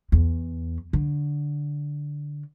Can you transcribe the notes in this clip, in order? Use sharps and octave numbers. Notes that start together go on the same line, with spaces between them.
E2
D3